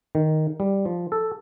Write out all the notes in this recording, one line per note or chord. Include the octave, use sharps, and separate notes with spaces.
D#3
G3
F3
A4